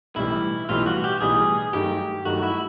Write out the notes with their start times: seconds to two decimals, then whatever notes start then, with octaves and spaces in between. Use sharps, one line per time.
0.16 B1 A2 E3 G3 E4
0.69 B1 A2 E3 G3 F4
0.86 F#4
1.04 G4
1.21 B1 A2 E3 G3 G#4
1.73 G2 D#3 F#3 A3 G4
2.25 G2 D#3 F#3 A3 F#4
2.43 E4